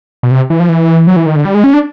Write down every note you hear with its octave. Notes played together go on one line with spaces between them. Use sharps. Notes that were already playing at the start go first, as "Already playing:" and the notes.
B2
C3
E3
F3
E3
F#3
E3
D#3
D3
G3
G#3
C#4
D4